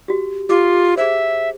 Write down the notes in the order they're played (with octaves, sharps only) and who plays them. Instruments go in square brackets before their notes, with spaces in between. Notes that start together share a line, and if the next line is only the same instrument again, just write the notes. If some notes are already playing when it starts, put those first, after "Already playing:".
[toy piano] F#4 G4
[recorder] F4 [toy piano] G4 D6
[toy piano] G#4 C5 [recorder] E5